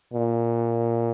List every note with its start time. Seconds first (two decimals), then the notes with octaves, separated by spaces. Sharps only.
0.13 A#2